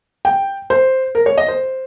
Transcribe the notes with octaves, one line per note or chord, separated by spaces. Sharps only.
G5
C5
A#4
C#5
D#5
C5